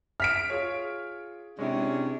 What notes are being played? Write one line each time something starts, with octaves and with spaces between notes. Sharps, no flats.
E5 F6 B6 D7
F4 G#4 C#5
C3 G#3 C#4 D4 E4